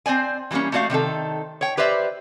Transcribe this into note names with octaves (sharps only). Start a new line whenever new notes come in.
C4 C5 D5 G#5
E3 F#3 G3 A#3 C#4
A3 C4 F#4 D5 F5
C3 D#3 D#4 A4
C#5 G5
G4 B4 C5 D5 E5